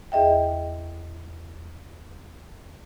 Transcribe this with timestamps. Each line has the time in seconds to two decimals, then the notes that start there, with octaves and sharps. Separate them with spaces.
0.12 E2 G#4 D#5 E5 G5